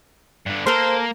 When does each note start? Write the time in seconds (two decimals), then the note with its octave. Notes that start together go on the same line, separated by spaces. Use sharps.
0.46 G2 D3
0.67 A#3 A4 A#4 C5